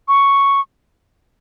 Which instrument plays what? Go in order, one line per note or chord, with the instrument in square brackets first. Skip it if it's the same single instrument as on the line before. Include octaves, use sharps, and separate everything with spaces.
[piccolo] C#6